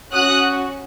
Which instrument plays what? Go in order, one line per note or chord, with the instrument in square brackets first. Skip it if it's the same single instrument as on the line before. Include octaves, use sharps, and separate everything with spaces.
[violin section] C#4 F#4 D#6 F#6